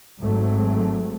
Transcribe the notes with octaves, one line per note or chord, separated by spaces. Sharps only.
G#1 G#2 F#3 A3 C4